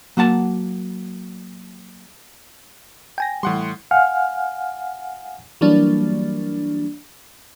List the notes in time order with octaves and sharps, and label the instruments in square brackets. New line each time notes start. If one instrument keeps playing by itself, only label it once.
[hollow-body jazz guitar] F#3 A#3 F#5 A5
[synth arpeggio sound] G5 G#5 A#6
[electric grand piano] A2 F#5 C6 [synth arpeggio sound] E3 G3
[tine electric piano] F5 F#5 G#5 F6
[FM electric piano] E3 F#3 G3 A#3 D4